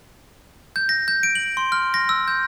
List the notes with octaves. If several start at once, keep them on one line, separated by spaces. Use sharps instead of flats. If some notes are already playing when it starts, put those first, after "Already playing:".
G6
A#6
G6
D7
F#7
C6
F6
A#6
E6
G6